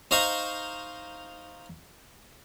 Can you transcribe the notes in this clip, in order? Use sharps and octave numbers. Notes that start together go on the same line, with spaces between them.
D#4 C5 D#5 F5 A#5 C#6